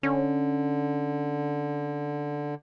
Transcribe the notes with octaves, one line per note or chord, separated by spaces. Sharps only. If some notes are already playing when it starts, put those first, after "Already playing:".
D3 C#4